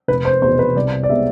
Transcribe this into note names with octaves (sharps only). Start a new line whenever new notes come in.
F1 B4
C5
E2 C5
B2
B4
C2 D5
D5
C3 G#3 B3 E5